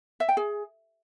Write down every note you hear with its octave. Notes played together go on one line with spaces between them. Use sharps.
E5
G5
G#4